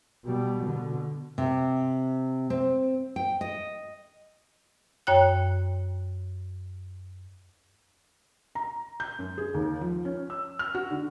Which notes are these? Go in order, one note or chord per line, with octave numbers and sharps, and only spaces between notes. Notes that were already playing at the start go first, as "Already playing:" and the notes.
B2 G3
B2 D3
C3
C4
G5
D#5
F#2 C#5 G5 F#6
A#5
G6
F#2
G#4
D#2
F3
C#4
E6
F6
F#4
D3